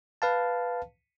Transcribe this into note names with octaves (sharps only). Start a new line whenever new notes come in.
B4 F5 A5